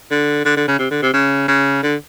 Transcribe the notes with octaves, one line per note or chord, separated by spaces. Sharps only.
D3
D3
D3
C#3
C3
D3
C3
C#3
C#3
D3